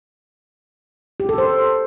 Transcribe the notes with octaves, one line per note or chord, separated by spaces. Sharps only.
G4
A4
C5